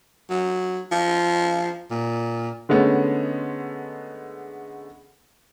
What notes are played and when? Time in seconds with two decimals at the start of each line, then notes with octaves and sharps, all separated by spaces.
0.30 F#3
0.92 F3
1.90 A#2
2.69 D3 G#3 A3 B3 C#4